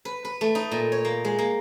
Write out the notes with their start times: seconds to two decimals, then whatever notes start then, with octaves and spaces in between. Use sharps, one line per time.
0.05 B4
0.25 B4
0.41 A3
0.55 D#4
0.71 A#2
0.92 C#5
1.05 A#3
1.25 G#3
1.39 A#3